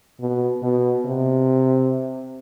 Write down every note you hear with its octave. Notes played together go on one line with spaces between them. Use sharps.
B2
B2
C3